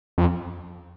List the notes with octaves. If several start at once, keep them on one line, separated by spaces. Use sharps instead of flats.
F2